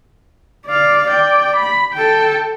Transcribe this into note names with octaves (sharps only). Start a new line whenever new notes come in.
D5 F5
D5 G5
B5
A4 G5